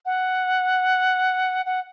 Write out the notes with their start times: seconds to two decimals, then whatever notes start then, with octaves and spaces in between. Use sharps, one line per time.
0.05 F#5
1.66 F#5